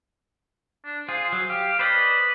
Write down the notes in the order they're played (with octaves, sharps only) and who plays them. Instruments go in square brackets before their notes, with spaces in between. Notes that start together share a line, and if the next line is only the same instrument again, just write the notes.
[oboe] D4
[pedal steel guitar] F4 G#4 [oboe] C5
[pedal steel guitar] F#3
[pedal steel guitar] G4 [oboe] F5
[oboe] B4 [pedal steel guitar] C5 D5 D#5